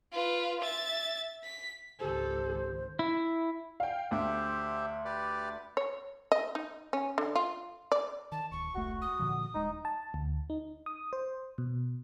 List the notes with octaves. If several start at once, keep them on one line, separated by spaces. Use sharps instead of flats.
F4 B4
E5 A6
B6
G#1 C#2 D#3 G4 A4 C5
E4
F5 G5
D2 G4 C5 E5
G4 B4 D5
C#5
D#5
D#4
C#4
D3
F4
D5
D#3 A5
D1 C#6
E1 C2 A3 F#4
D#6
A#2 D3 F3
D#1 G#3 D#4
A5
D2
D#4
D#6
C5
B2